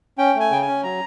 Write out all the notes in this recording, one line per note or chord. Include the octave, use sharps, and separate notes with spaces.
C#4 G5
A3
G#5
C#3 G5
G#5
C#4
F#3 A#5